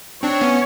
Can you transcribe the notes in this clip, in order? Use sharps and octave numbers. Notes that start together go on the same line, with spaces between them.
C4 D4 C#5
B3 C#4